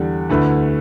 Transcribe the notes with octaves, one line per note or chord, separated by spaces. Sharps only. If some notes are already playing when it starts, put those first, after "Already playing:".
Already playing: E2 D3 G3 D4
D2 D3 A3 E4 B4